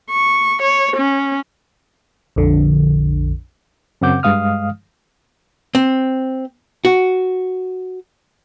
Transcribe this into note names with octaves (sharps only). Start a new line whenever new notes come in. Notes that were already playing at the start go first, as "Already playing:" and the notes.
C#6
C#5
C#4
A#1 F2 D3
F#2 C#3 C4 F#5 D6 G6
G2 G#3 F5 D#6 F6
C4
F#4